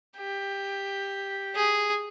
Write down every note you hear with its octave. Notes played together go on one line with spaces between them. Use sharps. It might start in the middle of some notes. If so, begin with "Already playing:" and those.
G4
G#4